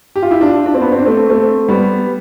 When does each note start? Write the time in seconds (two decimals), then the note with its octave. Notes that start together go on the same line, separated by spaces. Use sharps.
0.16 G4
0.23 F4
0.31 E4 G4
0.41 D4 F4
0.66 D4
0.74 C4
0.81 B3 D4
0.92 C4
0.99 D4
1.06 A3 C4
1.29 A3 C4
1.68 G3 B3